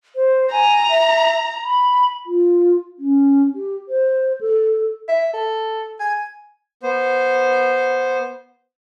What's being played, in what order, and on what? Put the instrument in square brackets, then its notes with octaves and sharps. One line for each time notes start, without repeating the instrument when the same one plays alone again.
[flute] C5
[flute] G#5 [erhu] A#5
[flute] E5
B5
[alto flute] F4
C#4
G4
C5
A4
[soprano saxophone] E5
A4
G#5
[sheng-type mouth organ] B3 C5